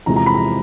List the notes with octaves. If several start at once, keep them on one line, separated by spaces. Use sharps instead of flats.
E2 C3 F3 G#3 A#5
A#5
B5
A#5